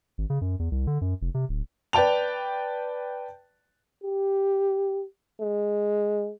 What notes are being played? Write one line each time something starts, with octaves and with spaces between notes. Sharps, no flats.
G#1
C#3
F#2
E2
C2
D3
F#2
F1
C3
D1
B4 D5 G5 A5 F7
G4
G#3